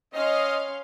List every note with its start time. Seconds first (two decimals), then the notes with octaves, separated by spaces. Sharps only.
0.14 C#4 D#5 F5 C6 F6